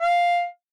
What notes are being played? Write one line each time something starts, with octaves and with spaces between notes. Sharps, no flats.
F5